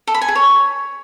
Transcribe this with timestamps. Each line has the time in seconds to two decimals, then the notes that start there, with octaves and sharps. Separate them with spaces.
0.07 A4
0.14 B5
0.21 G#5
0.28 G#4
0.35 C#5